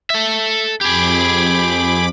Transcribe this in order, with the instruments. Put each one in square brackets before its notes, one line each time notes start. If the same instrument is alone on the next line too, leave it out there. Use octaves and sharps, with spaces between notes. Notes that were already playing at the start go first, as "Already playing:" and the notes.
[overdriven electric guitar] A4 E5
[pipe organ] F2 B5 D6 [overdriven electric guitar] G4 G#4